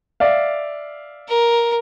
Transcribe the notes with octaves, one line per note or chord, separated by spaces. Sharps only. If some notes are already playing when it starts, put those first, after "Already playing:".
D5 E5 F5
A#4